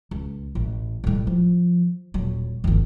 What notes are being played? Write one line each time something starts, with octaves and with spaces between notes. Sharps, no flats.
C#2
A1
A1 G3
F3
D#1 F#3
G1 D#2